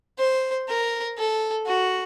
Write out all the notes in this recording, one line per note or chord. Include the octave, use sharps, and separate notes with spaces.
C5
A#4
A4
F#4